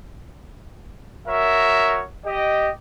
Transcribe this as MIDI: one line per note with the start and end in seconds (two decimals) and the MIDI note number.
1.28 2.02 66
1.28 2.02 70
1.28 2.02 73
1.28 2.02 76
2.25 2.69 67
2.25 2.69 75